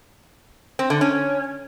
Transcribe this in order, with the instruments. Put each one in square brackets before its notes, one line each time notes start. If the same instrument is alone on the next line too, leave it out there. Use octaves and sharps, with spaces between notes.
[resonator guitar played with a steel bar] C4
D3
C#4